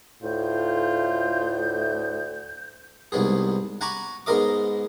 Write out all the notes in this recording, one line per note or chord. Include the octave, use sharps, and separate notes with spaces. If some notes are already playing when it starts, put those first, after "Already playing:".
D2 A2 F4 G6
C2 G#2 B3 G#4
F#5 G#5 A#5 B5 C#6 D6
G#2 G#3 B3 A#4 D#5 D6